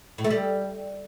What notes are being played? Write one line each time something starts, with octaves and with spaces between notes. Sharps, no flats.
A2
A3
G3